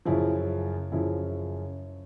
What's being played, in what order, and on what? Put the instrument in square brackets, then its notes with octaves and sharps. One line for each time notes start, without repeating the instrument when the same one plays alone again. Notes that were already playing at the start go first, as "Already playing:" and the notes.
[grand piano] F#2 C#3 F3 E4
F#2 C#3 F3 E4